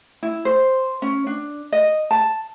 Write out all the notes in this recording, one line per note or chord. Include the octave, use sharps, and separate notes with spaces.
E4
C5
C#4
D4
D#5
A5